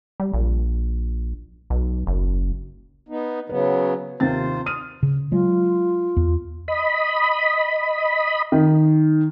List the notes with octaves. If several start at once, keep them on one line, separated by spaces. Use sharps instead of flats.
G3
A#1
B1
F#1
B3 D#4
C#3 F#3 B3 B4
D#2 C3 F4 C5 A6
D#6 F6 D#7
C#3
F#3 G#3 F4
E2
D#5 B5
D#3